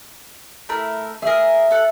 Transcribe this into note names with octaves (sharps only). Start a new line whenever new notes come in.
A3 E4 A#4
G#4 A#4 E5
A4 F#5